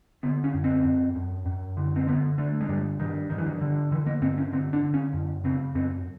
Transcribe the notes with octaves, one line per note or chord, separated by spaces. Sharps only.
D3 B3
C#4
F#2
C4
F#2
F#2
F#2
D3
C4
D3 B3
D3 A3
G#3
G2 G3
G2 D#3
G2 D#3
E3
D#3
D3
D3 E3
A#3
G2 C4
C#4
D3 C4
D4
D3
C#4
F#2
C#3 C4
F#2 C4